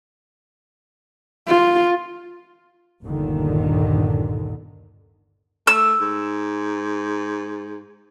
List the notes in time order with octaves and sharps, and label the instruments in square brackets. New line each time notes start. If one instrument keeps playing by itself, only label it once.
[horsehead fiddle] F4
[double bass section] G1 D#2 A#2 D3 D#3
[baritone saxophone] A3 [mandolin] E6
[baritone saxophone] G#2